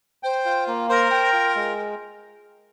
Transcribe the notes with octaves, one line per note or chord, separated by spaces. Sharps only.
C5 G5
F4
A#3
A#4 C5
G5
F4
G#3